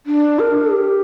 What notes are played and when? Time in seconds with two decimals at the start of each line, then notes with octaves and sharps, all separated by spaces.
0.06 D4
0.39 A#4
0.72 G4